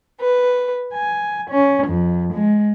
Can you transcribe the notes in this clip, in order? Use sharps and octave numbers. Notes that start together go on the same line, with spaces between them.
B4
G#5
C#4
F2
G#3